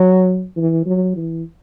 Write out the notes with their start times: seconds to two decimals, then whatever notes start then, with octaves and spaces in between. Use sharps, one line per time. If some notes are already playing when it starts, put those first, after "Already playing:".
Already playing: F#3
0.57 E3
0.86 F#3
1.16 E3